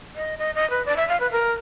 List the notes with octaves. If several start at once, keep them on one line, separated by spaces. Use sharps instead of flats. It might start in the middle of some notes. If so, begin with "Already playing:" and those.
D#5
D#5
D#5
B4
D5
E5
F5
B4
A#4